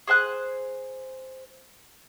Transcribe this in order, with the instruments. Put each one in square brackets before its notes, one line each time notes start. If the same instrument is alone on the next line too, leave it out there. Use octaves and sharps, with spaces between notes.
[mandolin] G#4 C5 G#5 F#6